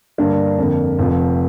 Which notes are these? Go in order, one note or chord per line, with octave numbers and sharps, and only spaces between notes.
G2 D3 A#3 D4
F2 D3 A#3
F1 F2 F3